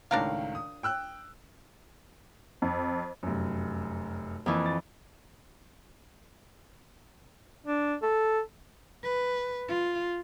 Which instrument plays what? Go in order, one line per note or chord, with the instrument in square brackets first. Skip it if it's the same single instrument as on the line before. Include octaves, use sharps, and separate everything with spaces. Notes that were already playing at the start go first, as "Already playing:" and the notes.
[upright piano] C#2 A2 D#3 [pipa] D4 A#4 F5
[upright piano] D#6
G5 E6 F#6
[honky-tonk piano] F2
[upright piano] F1 F#2
[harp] F2 E3 [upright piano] A#3 E6
[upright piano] A6
[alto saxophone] D4
A4
[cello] B4
F4